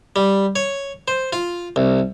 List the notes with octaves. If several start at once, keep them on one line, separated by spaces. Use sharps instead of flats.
G3
C#5
C5
F4
C2